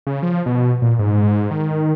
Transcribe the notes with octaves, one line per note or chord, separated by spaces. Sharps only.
C#3
F3
B2
A#2
G#2
G#2
D#3